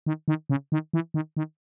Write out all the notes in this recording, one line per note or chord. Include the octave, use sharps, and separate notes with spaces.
D#3
D#3
C#3
D#3
E3
D#3
D#3